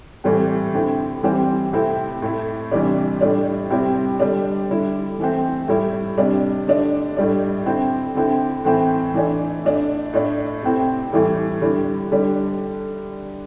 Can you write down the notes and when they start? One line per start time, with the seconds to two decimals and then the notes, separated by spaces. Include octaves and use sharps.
0.24 A2 E3 G3 C4
0.74 D3 C4 E4
1.23 E3 G3 C4
1.73 C3 A3 C4 E4
2.22 A2 A3 E4
2.72 C3 E3 G3 D4
3.21 A2 G3 D4
3.70 C3 G3 C4 E4
4.20 D3 G3 D4
4.69 D3 G3 E4
5.19 E3 A3 C4
5.68 A2 G3 E4
6.18 C3 G3 D4
6.67 D3 A3 D4
7.17 A2 G3 D4
7.66 D3 C4 E4
8.15 D3 C4 E4
8.65 A2 E3 C4 E4
9.14 E3 A3 D4
9.64 A2 A3 D4
10.13 A2 A3 D4
10.63 C3 A3 C4 E4
11.12 A2 E3 G3 E4
11.61 D3 G3 E4
12.11 D3 G3 D4